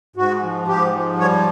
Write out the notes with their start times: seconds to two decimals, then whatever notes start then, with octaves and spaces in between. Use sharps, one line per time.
0.16 G#2 F#4
0.43 F3
0.67 G#2 G4
0.94 F3
1.19 G3 C#5